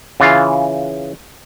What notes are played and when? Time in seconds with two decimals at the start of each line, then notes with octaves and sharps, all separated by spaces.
0.20 C#3 E3 F4 F5